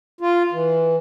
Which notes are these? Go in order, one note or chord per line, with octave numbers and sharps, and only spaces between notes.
F4
E3